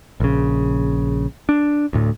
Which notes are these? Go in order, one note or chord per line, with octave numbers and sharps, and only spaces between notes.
A#1 C#3
D4
D2 A2